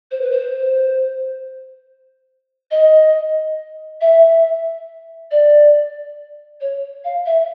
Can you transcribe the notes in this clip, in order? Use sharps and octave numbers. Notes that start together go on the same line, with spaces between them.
C5
B4
C5
D#5
E5
D5
C#5
F5
E5